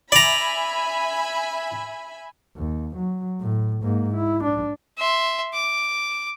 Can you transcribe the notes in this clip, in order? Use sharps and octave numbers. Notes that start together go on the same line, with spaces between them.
D5 E5 G#5 A#5 B5
D#2
F#3
A2
G#2 A#3
E4
D4
E5 C6
D6